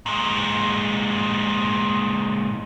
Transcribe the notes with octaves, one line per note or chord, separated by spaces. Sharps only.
A#2 G#3